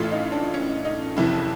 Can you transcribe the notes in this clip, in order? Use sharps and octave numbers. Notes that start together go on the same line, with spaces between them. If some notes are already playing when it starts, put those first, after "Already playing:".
Already playing: A1 A2 E3 A3 F4
D#4
D4
C#4
D#4
F#1 F2 C3 E3 E4